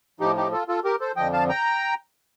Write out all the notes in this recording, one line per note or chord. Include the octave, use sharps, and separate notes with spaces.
A2 F3 D#4 G4
D#4 G4
F4 A4
F4 A4
G4 A#4
A4 C5
F2 D3 F3 D#5 G5
F5 A5
G5 A#5